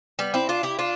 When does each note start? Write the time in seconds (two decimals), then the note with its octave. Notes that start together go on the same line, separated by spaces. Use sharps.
0.19 G3 B3
0.34 C4 E4
0.49 D4 F4
0.63 E4 G4
0.79 D4 F4